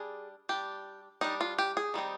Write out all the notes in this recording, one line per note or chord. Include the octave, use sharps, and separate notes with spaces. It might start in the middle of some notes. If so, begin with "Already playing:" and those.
Already playing: G3 D4 G#4
G3 D4 G4
G3 D4 D#4
F4
G4
G#4
D#3 G3 C4 D#4